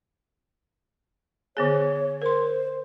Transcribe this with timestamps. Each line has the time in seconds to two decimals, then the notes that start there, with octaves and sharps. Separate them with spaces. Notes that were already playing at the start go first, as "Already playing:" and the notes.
1.57 D3 B3 G#4 C#5
2.22 A#4 C5 C6